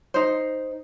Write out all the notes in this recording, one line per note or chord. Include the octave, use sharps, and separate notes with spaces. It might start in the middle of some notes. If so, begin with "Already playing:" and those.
D#4 C5